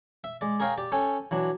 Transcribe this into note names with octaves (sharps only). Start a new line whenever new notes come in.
E5
G#3 D5
G#4 A#4 C#5 F5 G5
G4 D5
C#4 A4 G5 G#5
E3 F#3 D4